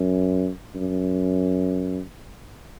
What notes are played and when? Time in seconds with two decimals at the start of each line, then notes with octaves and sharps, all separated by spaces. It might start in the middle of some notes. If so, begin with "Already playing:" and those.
Already playing: F#2
0.75 F#2